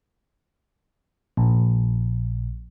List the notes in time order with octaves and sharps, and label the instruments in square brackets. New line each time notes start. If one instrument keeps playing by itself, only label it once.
[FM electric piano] A#1